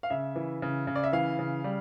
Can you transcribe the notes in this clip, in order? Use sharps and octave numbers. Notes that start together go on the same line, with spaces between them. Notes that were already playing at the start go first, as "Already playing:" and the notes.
F5
C#3 E5
E3
C#3
C#3
D5
E5
E3 F5
C#3
G3